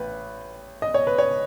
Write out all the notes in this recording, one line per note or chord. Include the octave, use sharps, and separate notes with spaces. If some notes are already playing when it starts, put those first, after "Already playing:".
Already playing: A1 B4
D#5
C#5
B4
C#5